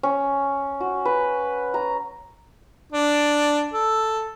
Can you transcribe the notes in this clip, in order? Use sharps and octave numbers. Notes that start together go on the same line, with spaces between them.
C#4
F#4
B4
A#5
D4
A4